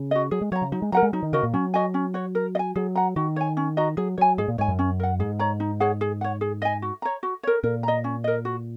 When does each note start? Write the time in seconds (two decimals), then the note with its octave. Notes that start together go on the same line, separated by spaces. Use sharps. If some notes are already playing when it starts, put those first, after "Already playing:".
Already playing: C#3
0.11 F#4 D#5
0.31 F#3 G#4
0.41 G#3
0.52 F#3 C#5 A#5
0.62 C#3
0.72 F#3 D#4
0.82 G#3
0.92 F#3 A#4 F#5 A#5
1.03 G#3
1.13 F#3 D#4
1.23 D#3
1.33 C#3 F#4 A#4 D#5
1.43 A#2
1.53 F#3 C#4
1.74 F#4 D#5 G#5
1.94 C#4
2.14 F#4 C#5
2.35 A#4
2.55 D#5
2.59 G#5
2.76 F#3 G#4
2.96 F#5 A#5
3.16 D#3 F#4
3.36 C#5 G#5
3.57 C#4
3.77 F#4 D#5 A#5
3.97 F#3 G#4
4.18 F#3 C#5 G#5
4.38 G#2 G#4
4.48 A#2
4.58 G#2 C#5 G#5
4.68 F#2
4.79 C#4
5.00 A#4 F#5
5.19 G#2 G#4
5.39 C#5 A#5
5.60 D#4
5.80 G#4 C#5 F#5
6.01 G#4
6.21 C#5 F#5
6.41 G#4
6.62 D#5 G#5
6.82 F#4
7.02 C#5 A#5
7.23 F#4
7.43 A#4 C#5
7.63 A#2 A#4
7.83 D#5 A#5
8.04 C#4
8.24 A#4 D#5
8.45 F#4